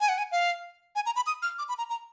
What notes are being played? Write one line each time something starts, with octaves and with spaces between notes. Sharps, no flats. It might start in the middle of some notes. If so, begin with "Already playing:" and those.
G#5
F#5
G#5
F5
G#5
A#5
B5
D#6
F6
D6
B5
A#5
A#5